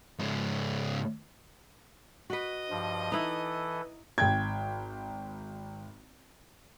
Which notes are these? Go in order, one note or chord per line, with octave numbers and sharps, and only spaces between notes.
G#2 C#3
F#4 B4 D#5
G2 F3
E3 D#4 E4 A4 B4
G#1 G5 G#6